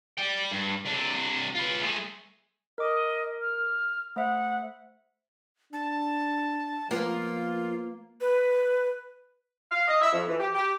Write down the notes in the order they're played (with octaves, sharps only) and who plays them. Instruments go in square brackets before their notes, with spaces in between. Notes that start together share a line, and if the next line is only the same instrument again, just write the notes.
[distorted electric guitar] D5 G5
G2
C3 D4
F4 B4
G#3 A3
[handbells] A#4 D6 [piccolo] D#5
[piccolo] F6
[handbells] A3 C5 E5 [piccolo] F#5
[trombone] D4 [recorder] A5
[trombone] F3 [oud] A#3 B3 [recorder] F4
[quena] B4
[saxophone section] F5
D#5
E5
F2
E3
G4
G4